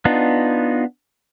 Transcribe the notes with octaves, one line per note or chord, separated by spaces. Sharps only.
B3 D4 D#4 F4